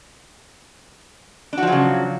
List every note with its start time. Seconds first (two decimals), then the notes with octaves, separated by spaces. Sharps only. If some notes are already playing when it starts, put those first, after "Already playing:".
1.53 D4
1.58 F#4
1.63 F3
1.67 F#3
1.72 C#3